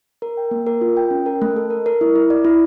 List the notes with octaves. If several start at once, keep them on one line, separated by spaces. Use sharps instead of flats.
A#4
G5
A#3
A#4
F4
G5
C#4
A#4
A3
A4
A#4
A#4
E4
E4
D5
E4